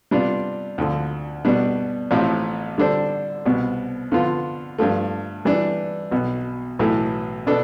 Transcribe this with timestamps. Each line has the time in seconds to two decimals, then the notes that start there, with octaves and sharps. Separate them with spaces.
0.11 C3 G3 B3 D4 F4
0.78 D2 D3 F3
1.45 B2 G3 B3 D4
2.11 A1 A2 F3 C4
2.78 D3 G3 D4 A4 C5
3.45 C2 B2 B3
4.12 D3 F3 B3 F4
4.78 G2 F3 A3
5.45 E3 G3 D4
6.11 B1 B2 B3
6.79 B1 A2 E3 A3 E4
7.47 B2 B3 D4 A4